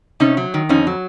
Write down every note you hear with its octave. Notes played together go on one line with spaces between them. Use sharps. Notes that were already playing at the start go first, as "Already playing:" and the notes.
C3 C#4 D#4
F#3
D#3
F2 C#4 D#4
F#3